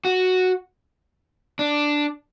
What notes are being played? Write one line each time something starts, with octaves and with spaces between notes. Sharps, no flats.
F#4
D4